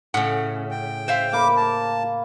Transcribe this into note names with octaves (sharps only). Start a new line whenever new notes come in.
A2 C#3 F#5
G5
C5 E5 F5
A#3 B5 D6
A5